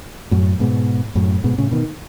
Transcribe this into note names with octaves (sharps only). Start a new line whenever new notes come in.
F#2 A2
G#2 B2
F#2 A2
G#2 B2
A2 C#3
B2 D#3